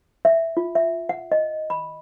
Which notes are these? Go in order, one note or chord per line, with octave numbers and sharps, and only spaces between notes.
E5
F4
E5
F#5
D#5
B5